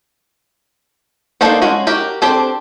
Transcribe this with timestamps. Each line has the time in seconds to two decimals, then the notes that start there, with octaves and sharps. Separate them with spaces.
1.41 A#3 D4 D#4 A4 C5
1.62 G#3 C#4 F#4
1.87 F#4 G4 A#4
2.22 C4 D4 G4 A4 C5